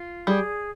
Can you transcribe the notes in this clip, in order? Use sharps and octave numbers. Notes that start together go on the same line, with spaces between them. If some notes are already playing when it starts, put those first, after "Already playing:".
Already playing: F4
G3 G#4